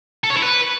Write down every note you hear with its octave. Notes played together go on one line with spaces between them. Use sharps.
A4
C#5
E4
B4